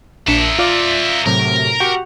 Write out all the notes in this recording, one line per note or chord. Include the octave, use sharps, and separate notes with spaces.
A#1 D4 A#4 E5 C#7
F4 D5
A2 C3 F#3 A#4
F#4 G4 F#5